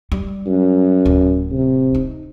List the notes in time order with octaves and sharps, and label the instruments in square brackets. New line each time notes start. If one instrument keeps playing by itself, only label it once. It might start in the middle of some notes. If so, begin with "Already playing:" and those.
[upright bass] G3
[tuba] F#2
[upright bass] D1
[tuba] C3
[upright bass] D#4